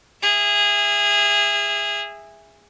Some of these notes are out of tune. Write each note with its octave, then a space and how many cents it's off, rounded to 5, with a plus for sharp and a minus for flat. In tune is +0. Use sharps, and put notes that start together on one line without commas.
G#4 -20 E5 +0